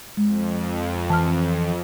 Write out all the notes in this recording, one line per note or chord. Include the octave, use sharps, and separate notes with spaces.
F2 G#3
E3 A5 F6